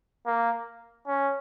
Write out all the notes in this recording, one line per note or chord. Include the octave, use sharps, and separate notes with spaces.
A#3
C#4